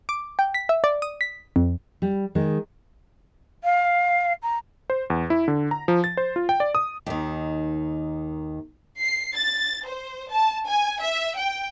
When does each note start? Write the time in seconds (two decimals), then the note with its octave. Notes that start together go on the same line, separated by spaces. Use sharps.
0.09 D6
0.39 G5
0.54 B6
0.69 E5
0.84 D5
1.02 D#6
1.21 B6
1.56 F2
2.02 G3
2.35 D#3 G#3
3.64 F5
4.42 A#5
4.90 C5
5.10 E2
5.30 E4
5.48 D3
5.71 A#5
5.88 F3
6.04 A6
6.17 C5
6.36 F4
6.49 G5
6.60 D5
6.75 D#6
7.06 D#2 D#3
9.01 C7
9.36 A6
9.87 C5
10.32 A5
10.68 G#5
11.02 E5
11.37 G5